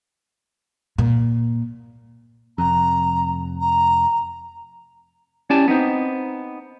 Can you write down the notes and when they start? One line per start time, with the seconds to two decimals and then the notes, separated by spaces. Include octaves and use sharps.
0.98 A#2
2.58 F1 F2 A#5
3.60 A#5
5.50 C#4 E4 G4 D5 G#5 A5
5.68 B3 C4 D#4 C5